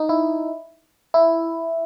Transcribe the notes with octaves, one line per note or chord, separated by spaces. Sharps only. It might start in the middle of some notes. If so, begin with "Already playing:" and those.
Already playing: D#4
E4
E4